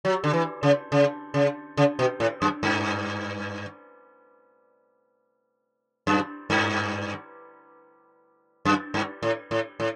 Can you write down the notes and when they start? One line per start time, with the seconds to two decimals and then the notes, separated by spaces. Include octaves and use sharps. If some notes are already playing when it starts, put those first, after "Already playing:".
0.05 F#3
0.24 D3
0.33 E3
0.63 C#3
0.92 C#3
1.34 C#3
1.77 C#3
1.99 B2
2.20 A2
2.42 F#2
2.63 G2
6.07 F#2
6.50 G2
8.65 F#2
8.94 G2
9.23 A2
9.51 A2
9.80 A2